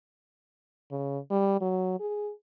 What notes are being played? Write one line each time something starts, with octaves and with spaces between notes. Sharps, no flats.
C#3
G3
F#3
G#4